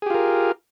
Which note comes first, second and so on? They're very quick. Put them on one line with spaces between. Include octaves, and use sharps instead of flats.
G#4 G4 F4 A#4